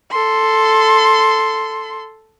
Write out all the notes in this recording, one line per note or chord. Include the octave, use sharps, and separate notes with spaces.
A4 C6